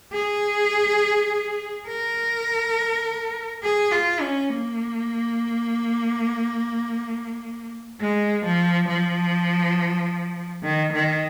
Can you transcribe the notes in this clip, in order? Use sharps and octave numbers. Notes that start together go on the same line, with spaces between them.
G#4
A#4
G#4
F4
C#4
A#3
G#3
F3
F3
D#3
D#3